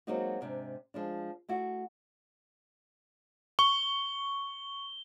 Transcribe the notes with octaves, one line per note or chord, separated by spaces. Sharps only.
F#3 G#3 A#3 C4 D#4 F#4
G#2 C3 D4
F3 G#3 D4
A3 E4 F#4
C#6 G7